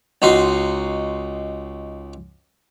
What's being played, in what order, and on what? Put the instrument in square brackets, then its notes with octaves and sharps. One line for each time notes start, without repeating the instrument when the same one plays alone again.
[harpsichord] C#2 D#4 F#4 C6